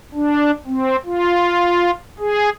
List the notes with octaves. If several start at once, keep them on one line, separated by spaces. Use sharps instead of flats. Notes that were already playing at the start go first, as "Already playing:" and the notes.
D4
C4
F4
G#4